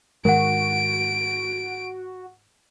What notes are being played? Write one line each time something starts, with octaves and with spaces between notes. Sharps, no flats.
G#2 D#3 G#3 F#4 A#4 F#5 D7